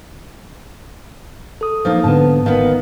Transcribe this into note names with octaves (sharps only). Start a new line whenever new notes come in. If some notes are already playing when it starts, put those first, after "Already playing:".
A4 D#6
F3 A#3 D#4
G#2 D3 B3 A5
G#1 D#3 B3 F5